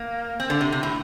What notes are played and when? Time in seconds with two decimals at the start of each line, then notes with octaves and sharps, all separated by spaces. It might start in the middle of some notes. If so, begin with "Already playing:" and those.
Already playing: A#3
0.40 C4
0.50 D3
0.61 C3
0.72 C3
0.83 A2